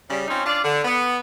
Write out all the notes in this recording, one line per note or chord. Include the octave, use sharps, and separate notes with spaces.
C#3 G3
C4 C#4 D#4 F4
D4 F4 D5
D3
B3